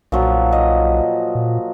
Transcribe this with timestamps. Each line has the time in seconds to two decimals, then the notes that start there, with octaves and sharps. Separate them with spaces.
0.12 B1 A#2 F3 F#3
0.52 D#5
1.35 A#2